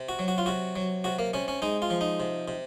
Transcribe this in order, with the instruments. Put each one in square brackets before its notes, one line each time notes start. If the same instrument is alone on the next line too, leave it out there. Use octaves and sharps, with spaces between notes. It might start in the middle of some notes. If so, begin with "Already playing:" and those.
Already playing: [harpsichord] C3
F#4
F#3
F#4
F4
C3 F#4
F#3
C3 F#4
A#3
C3 C#4
C#4
G#3 D#4
F4
F3
D#4
C3
C3